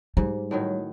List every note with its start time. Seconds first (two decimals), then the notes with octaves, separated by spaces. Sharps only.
0.17 G#2 G3
0.51 A2 D#3 F#3